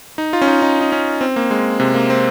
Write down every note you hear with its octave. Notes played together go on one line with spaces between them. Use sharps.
D#4
F4
C#4
D#4
D#4
D#4
C#4
C4
A#3
G#3
C3
A#3
C4